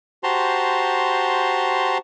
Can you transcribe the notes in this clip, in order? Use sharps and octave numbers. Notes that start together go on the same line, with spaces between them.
F#4 G4 C5 A5 A#5 C6